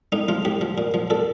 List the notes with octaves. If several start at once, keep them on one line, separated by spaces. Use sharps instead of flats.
A2 D#4
F3 F4
A2 G4
F3
A#2
F3
A#2 A4